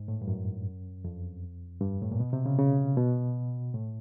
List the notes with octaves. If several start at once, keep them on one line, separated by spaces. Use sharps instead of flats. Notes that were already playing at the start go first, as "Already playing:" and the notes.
Already playing: G#2
A2
G2
F#2
F2
G2
A2
A#2
B2
C3
C#3
C#3
B2
A2